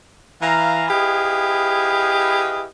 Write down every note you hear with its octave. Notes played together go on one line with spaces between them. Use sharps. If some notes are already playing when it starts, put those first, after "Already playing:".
E3 F5 A#5
E4 G4 G#4 B4 D#5 F5